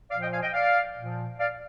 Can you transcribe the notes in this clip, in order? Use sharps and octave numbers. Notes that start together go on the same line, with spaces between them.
A#2 F3 D5 F5
D#5 G5
F5 G#5
D#5 G5
D5 F5
A#2 F3
D5 F5